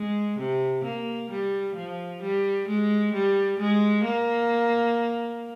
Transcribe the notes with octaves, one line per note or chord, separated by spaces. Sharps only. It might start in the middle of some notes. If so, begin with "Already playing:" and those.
Already playing: G#3
C3
A#3
G3
F3
G3
G#3
G3
G#3
A#3